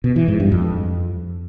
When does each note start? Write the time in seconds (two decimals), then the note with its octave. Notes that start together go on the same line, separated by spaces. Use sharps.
0.04 B2
0.16 E3
0.28 G#2
0.40 G2
0.52 F2